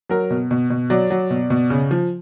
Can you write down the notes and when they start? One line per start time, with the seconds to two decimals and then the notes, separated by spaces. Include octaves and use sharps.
0.09 F#3 A#4
0.30 B2
0.51 B2
0.70 B2
0.90 F#3 D5
1.10 F#3
1.30 B2
1.50 B2
1.70 C#3
1.91 F3